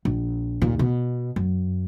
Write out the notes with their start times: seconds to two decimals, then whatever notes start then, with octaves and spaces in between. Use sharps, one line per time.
0.05 A#1
0.62 D#2 A#2
0.79 B2
1.36 F#2